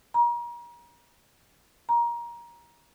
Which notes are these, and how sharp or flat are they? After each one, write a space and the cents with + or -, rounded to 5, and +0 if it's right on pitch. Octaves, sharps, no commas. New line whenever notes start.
A#5 +35
A#5 +20